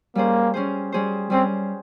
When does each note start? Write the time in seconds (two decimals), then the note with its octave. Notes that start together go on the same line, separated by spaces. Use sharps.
0.15 G3 A#3 C#4 G#4 C5
0.54 G3 C#4 G#4 C5
0.92 G3 C#4 G#4 C5
1.30 G3 C4 C#4 G#4 C5